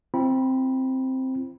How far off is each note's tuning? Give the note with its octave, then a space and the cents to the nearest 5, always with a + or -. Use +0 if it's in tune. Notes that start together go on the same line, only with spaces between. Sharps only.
C4 +0 F4 -45 B5 -30